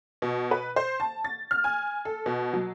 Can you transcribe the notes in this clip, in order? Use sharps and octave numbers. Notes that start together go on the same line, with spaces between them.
B2
B4
C5
A5
A6
F6
G#5
A4
B2
F#3